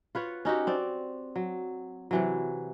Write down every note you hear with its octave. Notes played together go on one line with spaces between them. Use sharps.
F4 B4 C#5 F#5
C#4 D#4 F#4 G4
C4 D5
F#3
C3 E3 F#3